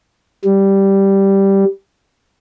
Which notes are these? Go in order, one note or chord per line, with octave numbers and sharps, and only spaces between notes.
G3